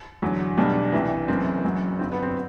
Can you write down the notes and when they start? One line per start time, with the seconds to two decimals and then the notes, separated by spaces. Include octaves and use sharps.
0.22 E2 D3 F#3
0.57 B1 B2 G3 D4
0.92 C2 C3 E3
1.28 F#1 F#2 E3 C4
1.64 F#1 F#2 F#3
1.99 G1 G2 F#3 C4
2.12 B3
2.23 C4